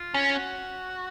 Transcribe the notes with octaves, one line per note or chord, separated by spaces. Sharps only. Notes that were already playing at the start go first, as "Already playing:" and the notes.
Already playing: F4
C#4
F#4